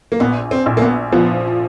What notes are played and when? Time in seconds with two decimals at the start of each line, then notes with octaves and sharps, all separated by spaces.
0.12 A#3
0.20 A#1 B3
0.51 C4
0.66 A#1
0.77 A#3
0.82 B3
1.12 F3 B3